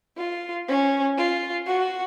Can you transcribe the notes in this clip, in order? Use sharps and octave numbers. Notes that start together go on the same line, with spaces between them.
F4
C#4
F4
F#4